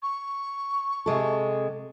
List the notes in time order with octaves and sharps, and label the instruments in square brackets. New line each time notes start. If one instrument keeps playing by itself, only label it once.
[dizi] C#6
[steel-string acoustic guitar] C3 G#3 A4